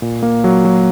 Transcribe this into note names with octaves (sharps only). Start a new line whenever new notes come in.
A#2
A#3
F#3
F#3